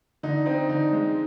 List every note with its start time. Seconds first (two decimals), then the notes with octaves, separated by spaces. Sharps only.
0.23 D3 D#4
0.46 C4 D#4
0.69 D3 D#4
0.93 G#3